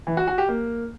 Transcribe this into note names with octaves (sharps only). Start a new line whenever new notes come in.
E3
F#4
F#4
G4
A#3